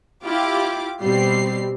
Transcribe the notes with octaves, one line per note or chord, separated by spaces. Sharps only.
E4 F4 G4 D6
B2 G3 C4 G4 C7